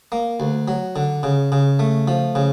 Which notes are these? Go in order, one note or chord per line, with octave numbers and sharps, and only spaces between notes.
A#3
D2
F#3
D3
C#3
C#3
A3
F3
C#3